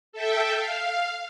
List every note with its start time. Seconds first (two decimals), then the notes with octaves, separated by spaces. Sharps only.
0.13 A4 E5 G5
0.57 F5